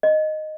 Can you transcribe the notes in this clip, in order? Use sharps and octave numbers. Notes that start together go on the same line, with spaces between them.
D#5